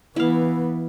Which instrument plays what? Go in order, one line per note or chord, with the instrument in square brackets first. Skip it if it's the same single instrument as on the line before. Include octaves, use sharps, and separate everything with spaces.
[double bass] E3 B3 [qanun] E4 F5